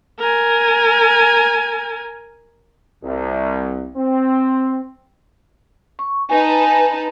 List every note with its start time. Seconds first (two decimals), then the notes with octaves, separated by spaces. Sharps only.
0.19 A#4 G#5
3.03 C2
3.95 C4
5.99 C#6
6.30 D#4 B4 G#5 A5